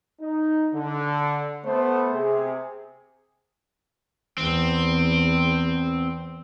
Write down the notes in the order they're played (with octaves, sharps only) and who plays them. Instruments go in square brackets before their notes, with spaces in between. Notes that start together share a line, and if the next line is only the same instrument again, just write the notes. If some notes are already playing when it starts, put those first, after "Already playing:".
[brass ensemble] D#4
D3
A3 B3 C5
C3 G#4
[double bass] E2 [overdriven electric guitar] C4